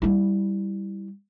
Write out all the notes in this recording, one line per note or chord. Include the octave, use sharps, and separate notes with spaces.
G3 E4